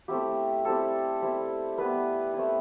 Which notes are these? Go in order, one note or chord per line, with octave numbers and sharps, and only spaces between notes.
A3 C4 E4 G4
G3 C4 E4 A4
G3 C4 E4
G3 B3 E4 B4
A3 C4 E4